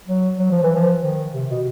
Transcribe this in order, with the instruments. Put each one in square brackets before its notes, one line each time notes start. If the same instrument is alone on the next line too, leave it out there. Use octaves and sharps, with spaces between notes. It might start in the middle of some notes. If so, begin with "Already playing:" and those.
[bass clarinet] F#3
F#3
F3
E3
F3
D#3
C3
B2